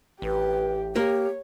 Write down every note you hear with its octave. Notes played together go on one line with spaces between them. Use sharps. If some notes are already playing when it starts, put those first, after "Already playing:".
A1 G4 B4
A#3 G4 A#4 C#5